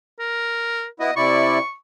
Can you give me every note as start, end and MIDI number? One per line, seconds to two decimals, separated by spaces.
0.19 0.86 70
1.00 1.11 59
1.00 1.11 64
1.00 1.11 66
1.00 1.16 75
1.16 1.59 48
1.16 1.59 64
1.16 1.59 74
1.16 1.73 85